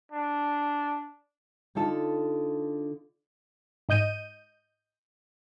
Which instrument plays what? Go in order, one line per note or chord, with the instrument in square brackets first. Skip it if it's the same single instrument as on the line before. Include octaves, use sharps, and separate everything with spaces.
[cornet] D4
[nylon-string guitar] D3 D#4 F4 A4
[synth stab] G#2 D#5 G6 D#7